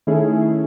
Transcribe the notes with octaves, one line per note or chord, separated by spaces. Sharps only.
D#3 A3 C#4 E4 G#4